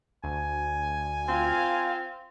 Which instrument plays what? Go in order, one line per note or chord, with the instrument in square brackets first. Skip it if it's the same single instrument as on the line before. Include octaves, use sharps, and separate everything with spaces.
[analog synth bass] D2 [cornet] G#5
[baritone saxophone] C4 [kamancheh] F4 F5